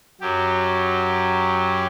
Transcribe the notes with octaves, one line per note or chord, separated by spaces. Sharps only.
F#2 F#3 G4